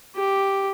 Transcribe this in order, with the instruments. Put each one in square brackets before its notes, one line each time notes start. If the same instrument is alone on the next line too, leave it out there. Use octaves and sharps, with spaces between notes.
[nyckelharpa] G4